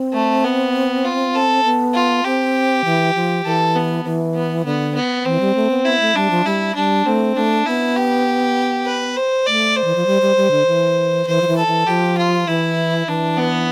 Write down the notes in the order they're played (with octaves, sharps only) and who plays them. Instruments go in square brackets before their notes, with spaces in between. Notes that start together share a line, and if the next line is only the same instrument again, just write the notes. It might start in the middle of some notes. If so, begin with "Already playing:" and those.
Already playing: [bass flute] C4
[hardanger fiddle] A3
B3
F4
A4
[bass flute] B3
[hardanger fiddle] F4
[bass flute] C4 [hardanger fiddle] G4
[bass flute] E3
F3
[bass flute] E3 [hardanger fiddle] A4
[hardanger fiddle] B3
[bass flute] E3
[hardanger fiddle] B3
[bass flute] D3 [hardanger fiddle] B3
[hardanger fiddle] B3
[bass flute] E3 [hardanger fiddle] C4
[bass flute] G3
A3
B3
[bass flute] B3 [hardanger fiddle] E4
[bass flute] A3
[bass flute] G3 [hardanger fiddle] D4
[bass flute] F3
[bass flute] G3 [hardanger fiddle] E4
[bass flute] G3 [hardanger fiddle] D4
[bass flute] A3 [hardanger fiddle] C4
[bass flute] A3 [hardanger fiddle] D4
[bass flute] B3 [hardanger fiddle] E4
[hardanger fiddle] G4
B4
C5
[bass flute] A3 [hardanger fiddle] D5
[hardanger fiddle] C5
[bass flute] E3
F3
G3
G3
G3
D3
E3
[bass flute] E3 [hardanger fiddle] C5
[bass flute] F3
E3
[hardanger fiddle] A4
[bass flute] E3
[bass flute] F3 [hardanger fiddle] G4
[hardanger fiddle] F4
[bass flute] E3 [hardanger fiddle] E4
[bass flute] E3 [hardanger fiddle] D4
[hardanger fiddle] B3